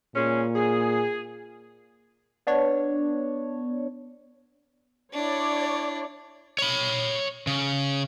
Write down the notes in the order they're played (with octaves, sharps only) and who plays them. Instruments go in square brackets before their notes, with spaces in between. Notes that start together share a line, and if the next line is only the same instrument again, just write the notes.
[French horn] A#2 [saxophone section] G#3 C#4
[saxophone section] G#4
[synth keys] B3 D4 C#5
[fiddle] D4 E4 [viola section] C#5 D5
[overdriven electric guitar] C#5 B5
C#3